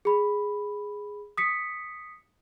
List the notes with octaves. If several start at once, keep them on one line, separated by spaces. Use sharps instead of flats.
G#4 B5
D#6 B6 C#7